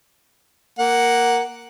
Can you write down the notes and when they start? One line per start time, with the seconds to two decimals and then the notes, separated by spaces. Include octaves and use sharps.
0.79 A#3 F#5